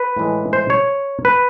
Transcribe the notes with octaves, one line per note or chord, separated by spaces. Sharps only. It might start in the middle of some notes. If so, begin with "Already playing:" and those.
Already playing: B4
A2 E3 G#3
C5
C#5
B4